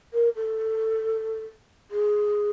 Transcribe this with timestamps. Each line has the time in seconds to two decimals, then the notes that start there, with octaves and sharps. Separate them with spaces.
0.13 A#4
0.36 A4
1.91 G#4